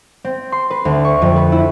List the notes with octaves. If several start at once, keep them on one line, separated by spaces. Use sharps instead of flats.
C4
C6
B4
D2
C#6
F2
B4
E4